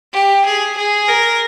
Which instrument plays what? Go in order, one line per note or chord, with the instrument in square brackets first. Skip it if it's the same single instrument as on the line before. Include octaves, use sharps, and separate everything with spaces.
[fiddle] G4
G#4
G#4
A#4